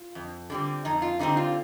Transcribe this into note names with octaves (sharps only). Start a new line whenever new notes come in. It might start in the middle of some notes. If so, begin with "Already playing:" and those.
Already playing: F4
F2
D3 G3 C4
F2 D#4
F4
D3 G3 C4 D#4
F4